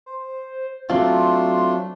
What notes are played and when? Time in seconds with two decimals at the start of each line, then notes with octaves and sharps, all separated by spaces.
0.06 C5
0.90 F#3 A3 C4 D4 F4 C6